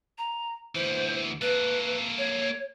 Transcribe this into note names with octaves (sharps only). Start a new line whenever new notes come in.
A#5
D2 E3 C5
A#3 A4 B4
C#5